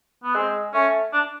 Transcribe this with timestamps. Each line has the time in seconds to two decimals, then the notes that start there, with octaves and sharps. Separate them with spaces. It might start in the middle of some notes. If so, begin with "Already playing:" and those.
0.24 B3
0.35 G#3 C4
0.74 A3 C#4
1.13 D4